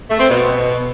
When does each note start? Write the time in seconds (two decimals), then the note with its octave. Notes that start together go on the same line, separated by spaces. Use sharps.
0.10 A3
0.20 C4
0.29 B2